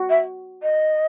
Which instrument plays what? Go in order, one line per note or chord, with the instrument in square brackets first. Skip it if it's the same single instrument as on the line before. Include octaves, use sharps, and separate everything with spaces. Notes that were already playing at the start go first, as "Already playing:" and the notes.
Already playing: [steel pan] F#4
[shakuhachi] E5
D#5